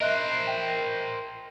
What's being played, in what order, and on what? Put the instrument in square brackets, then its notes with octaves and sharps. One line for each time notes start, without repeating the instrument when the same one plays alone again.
[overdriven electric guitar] A#4 C5 [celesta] D#5 E5 F#6
[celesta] G5